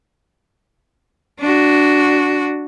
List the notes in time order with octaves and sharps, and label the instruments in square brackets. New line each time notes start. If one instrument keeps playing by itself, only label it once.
[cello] D4 F#4